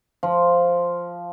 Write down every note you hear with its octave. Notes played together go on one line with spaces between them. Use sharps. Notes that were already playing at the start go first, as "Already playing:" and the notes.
F3